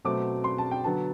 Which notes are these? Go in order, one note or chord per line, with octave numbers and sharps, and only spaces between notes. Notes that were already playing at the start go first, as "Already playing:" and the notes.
B2 F#3 A3 C4 D6
C6
A5
G5
D3 F#3 B3 A5